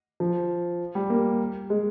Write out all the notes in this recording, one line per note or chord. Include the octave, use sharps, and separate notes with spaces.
F3
G3
A#3
G#3